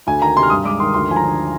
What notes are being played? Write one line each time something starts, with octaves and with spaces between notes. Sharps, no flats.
D2 G#5
D#3 A#5
C3 C6
F6
G2 D#6
G#3 D6
D#3 C6
D2 C6
F3 G#5
A#5
D3